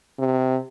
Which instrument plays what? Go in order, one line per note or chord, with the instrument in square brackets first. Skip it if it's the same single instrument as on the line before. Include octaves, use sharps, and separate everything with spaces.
[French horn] C3